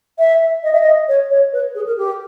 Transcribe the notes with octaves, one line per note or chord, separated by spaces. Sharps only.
E5
D#5
E5
D#5
C#5
C#5
B4
G#4
A#4
G4